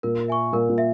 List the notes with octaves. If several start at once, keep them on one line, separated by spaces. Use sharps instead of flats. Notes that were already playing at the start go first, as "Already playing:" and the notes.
A#2 A#4
E5 G#5 C#6
A#2 A#4
A#2
E5